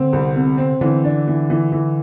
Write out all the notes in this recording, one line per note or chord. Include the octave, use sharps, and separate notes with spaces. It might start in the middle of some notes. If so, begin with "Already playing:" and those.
Already playing: D3 C4
C2
C3
C4
D3 E3
D4
E3
E3
E3